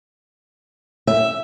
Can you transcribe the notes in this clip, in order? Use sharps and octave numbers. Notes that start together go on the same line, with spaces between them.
E5